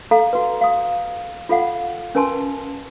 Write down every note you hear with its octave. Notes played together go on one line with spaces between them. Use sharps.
A4 F5 A#5
F#4 B4
F5 D#6
F4 A4 F5 F#5
C#4 A#4 B4 G#5 A5 C6